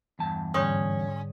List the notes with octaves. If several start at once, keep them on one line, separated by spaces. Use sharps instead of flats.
E2 G2 A5
G#2 D3 G3 C#4 C#5 C#6 D#6